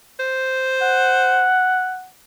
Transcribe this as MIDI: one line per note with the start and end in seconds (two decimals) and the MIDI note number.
0.19 1.48 72
0.82 2.07 78